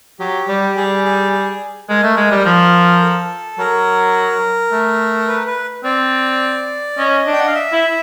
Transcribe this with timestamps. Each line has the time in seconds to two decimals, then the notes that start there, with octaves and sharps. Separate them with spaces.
0.20 F#3 G4
0.48 G3
0.76 G3 G#4
1.04 G#4
1.32 G#4
1.89 G#3 A#4
2.03 A3
2.17 G#3
2.31 G3
2.46 F3
3.02 A4
3.59 F#3 A#4
4.72 A3
5.28 B4
5.47 B4
5.84 C4 D5
6.97 C#4 D#5
7.27 D4
7.33 G5
7.40 F#5
7.47 F5
7.55 E5
7.72 E4